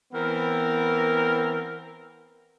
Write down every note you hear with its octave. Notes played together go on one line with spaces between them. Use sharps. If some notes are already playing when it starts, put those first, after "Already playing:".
E3 B3 C4 A#4